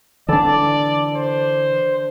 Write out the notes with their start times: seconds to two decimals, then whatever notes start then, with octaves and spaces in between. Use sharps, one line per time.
0.28 D3 E3 D4 A4 D5
1.15 C5